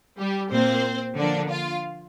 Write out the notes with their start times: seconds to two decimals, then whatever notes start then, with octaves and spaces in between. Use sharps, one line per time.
0.18 G3 G4
0.51 A#2 A#3 C4 C5
1.17 D3 F3 A#3 D4 D5
1.49 F4 F5